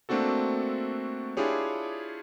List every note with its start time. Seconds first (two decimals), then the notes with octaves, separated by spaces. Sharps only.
0.09 A3 A#3 C4 D4 F#4 A4
1.37 D4 E4 F4 G4 G#4 C#5